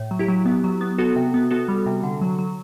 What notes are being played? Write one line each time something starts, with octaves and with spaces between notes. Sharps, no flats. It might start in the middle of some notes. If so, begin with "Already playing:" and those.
Already playing: A2
F#3
E4 G4
F#3
B3
F#3
B3
B3 F#4 A4
C3
B3
B3 F#4 A4
G3
C3
D3
F#3
F#3